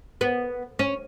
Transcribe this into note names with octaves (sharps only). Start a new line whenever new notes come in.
B3
C#4